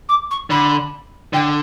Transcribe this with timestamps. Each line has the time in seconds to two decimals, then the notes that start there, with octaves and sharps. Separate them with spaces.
0.08 D6
0.30 C#6
0.50 D3 B5
1.33 D3 G5